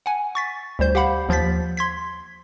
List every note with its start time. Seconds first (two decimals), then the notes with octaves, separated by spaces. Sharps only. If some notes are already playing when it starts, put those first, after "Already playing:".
0.06 F#5 G#5
0.35 C#6 A6 B6
0.79 D2 G3 C5 G6
0.95 G4 F5 F#5 B5
1.29 D#2 F3 G6 A6 B6
1.77 C6 G#6 B6